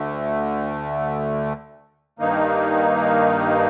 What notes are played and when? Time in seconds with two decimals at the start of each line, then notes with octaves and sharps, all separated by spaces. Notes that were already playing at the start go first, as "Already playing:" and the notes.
Already playing: D2 D3 A3
2.19 G2 D#3 A#3 D#4